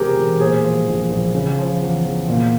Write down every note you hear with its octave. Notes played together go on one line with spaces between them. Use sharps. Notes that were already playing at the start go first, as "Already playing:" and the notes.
Already playing: E1 E2 C3 G4 G#4 A#4 C5
E1
A#2 G#4 C5
F3
A#1
A#1
C#3
F3
E2
E2
A#2